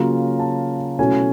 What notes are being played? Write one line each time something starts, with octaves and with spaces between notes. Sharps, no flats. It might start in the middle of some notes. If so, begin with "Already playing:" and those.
Already playing: C#3 F#3 A#3 C#4 F4 A#5
A5
B2 F#3 A3 C#4 E4 G#5